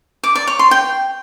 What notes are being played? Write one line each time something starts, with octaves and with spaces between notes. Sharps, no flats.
D6
D5
C#5
C6
G5